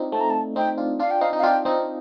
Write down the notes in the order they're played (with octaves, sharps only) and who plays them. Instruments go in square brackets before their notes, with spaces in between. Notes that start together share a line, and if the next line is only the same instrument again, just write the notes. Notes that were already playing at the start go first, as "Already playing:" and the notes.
Already playing: [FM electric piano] C4 D4 D#4 F4
[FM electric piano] A3 C4 [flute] A5
[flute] A#5
A5
[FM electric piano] C4 D#4 [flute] G5
[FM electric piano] D4 F4
[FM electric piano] D4 F4 [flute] F5
[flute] G5
[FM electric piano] C4 D#4 [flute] F5
[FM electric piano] D#4
[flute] F5
[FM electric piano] D4 F4 [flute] G5
[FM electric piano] C4 D#4